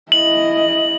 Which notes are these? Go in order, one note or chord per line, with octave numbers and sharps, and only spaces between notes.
E4 D#5 F#7